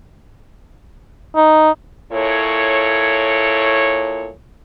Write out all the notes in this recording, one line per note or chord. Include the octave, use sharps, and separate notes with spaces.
D#4
A#2 E4 A4 C#5